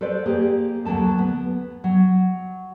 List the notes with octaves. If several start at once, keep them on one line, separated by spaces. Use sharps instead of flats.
A4 B4 C5 D5
A#3 G4 G#4
D2 F#3 A#3 A4 A5
B3
F#3